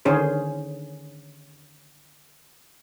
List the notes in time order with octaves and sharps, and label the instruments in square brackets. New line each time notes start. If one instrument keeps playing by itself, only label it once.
[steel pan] D3 D#3 C#4 G#4 C5